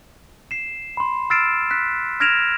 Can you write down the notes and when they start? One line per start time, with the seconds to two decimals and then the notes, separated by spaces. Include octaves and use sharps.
0.51 C7 E7
0.97 B5 C6
1.30 E6 F6 A6 C7 D7 E7
1.70 F#6 B6
2.20 F6 G#6 A#6 D7 E7 F7